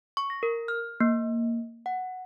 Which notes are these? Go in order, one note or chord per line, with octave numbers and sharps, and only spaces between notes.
C#6
A#6
A#4
F6
A#3
F#5